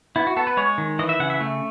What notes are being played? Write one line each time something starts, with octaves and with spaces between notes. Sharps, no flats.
B3 E4
F#4
B3 A4
B4
G#3 C#5
D#3
E3 D#5
E5
C#3 F#5
E5
A3